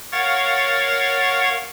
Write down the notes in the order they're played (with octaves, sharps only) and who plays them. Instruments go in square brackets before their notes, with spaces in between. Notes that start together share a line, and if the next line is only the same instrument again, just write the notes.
[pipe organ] A#4 C#5 F5 F#5 C#6 A6